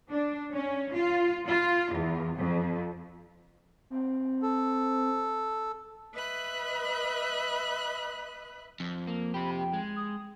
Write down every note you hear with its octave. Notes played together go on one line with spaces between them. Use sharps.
D4
C#4
F4
F4
E2
F2
C4
A4
B4 D#5 E5 B5 F#6
F2
A#3
C4 G4 B5
G5
G#3
D#6